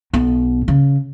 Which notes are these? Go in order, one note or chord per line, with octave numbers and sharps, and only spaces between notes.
B1 B2
C#3